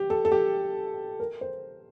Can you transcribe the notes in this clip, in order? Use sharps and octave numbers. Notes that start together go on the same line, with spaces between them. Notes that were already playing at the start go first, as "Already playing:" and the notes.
Already playing: G4
A4
A4
G4
A#4
C5